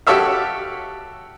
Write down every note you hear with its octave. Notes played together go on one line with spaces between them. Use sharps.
F#4 G4 A4 C#5 E5 F5